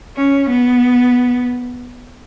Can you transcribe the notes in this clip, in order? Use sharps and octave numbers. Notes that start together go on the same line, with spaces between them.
C#4
B3